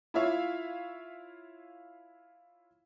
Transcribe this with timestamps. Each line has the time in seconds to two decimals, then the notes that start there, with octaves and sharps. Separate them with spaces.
0.14 E4 F4 C#5 E5 F5